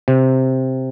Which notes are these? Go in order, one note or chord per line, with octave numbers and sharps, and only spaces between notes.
C3